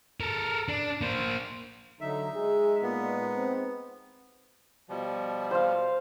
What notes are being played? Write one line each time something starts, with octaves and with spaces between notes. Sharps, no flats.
A4 A#4
D4
A#3 C5
D3 F#3 D#4 E5
G#3 D#4 G#4
A#2 B3
C4
B2 F3 G3
C5 F5